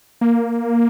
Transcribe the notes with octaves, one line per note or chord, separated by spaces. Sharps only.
A#3